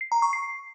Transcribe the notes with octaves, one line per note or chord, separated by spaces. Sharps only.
C7
A#5
C#6
C7